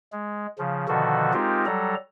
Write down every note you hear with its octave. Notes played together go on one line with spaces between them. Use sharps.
G#3
C#3 F3
B2 D3 D#3 F3 F#4 A4
G#3 C4 D#4 F4 G4 A#4
F#3 G3 A4 A#5